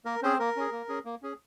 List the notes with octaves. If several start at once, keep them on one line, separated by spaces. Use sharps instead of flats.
A#3 A#4
C4 C#4 G#4 C5
A#3 A#4
C#4 G#4
A#3
C#4 G#4
A#3
C#4 G#4